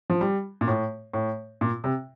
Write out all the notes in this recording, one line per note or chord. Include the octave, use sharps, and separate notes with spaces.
F3
G3
A#2
A2
A2
A#2
C3